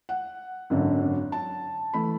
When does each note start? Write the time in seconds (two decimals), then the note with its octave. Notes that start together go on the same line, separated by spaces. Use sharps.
0.09 F#5
0.70 G#1 F#2 D3
1.32 A5
1.93 E3 A3 B5